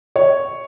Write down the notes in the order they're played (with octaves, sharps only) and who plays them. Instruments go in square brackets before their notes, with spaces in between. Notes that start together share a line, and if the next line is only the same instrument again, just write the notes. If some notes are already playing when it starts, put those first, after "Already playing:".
[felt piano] C#5